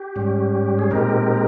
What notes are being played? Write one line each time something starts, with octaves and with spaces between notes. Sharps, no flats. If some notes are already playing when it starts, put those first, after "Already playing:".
Already playing: G4
G#2 G3 C#4
G#4
A#2 G#3 C4 D#4 G4 A#4